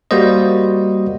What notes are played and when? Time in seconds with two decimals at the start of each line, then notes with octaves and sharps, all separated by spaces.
0.11 G3 A#3 F#4 C5 D#5